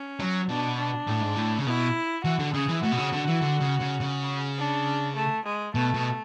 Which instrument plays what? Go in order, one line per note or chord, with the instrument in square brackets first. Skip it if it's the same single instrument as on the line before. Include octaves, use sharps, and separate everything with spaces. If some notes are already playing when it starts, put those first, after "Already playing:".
Already playing: [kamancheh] C#4
[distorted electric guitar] F#3
[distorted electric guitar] B2 [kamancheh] D4
[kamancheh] D4
[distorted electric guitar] A2
G#2
A2
C#3
[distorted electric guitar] B2 [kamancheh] E4
[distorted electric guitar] E3 [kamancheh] F#4
[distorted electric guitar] D3
[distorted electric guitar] C#3 [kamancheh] G#4
[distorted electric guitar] E3
[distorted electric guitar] A2 [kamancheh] F#4
[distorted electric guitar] B2
C#3
D3
E3
D3
C#3
C#3
C#3
[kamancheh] D4
A3
G#3
[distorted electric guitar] B2 [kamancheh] A3
[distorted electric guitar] B2